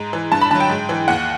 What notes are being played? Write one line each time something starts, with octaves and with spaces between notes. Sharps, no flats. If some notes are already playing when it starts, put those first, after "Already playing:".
Already playing: G#2 A#5
E3
G2 A5
B5
D3 F#3 A5
G5
G#2
E3
D#2 F#5